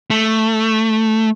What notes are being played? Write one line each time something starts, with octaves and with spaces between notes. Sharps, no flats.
A3